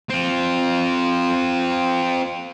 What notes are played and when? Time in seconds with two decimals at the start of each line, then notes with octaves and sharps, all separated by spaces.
0.10 C4 F4